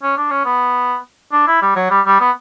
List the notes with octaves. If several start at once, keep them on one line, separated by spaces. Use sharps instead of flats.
C#4
D4
C#4
B3
D4
E4
G3
F#3
G3
G3
B3